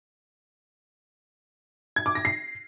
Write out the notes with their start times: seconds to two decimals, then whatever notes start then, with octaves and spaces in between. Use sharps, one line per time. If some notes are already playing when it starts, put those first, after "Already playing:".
1.96 G#6
2.06 D6
2.15 A#6
2.25 C7